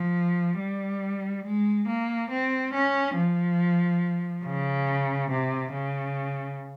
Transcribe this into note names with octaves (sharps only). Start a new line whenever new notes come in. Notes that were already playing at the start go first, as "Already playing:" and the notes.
Already playing: F3
G3
G#3
A#3
C4
C#4
F3
C#3
C3
C#3